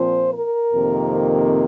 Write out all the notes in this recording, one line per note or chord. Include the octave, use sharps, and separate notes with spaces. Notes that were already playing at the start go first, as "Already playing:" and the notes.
Already playing: A#2 F3 C4 C5
A#4
F2 C3 D#3 A#3